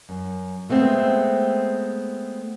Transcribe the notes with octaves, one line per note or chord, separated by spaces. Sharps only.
F#2
G#3 A3 B3 C4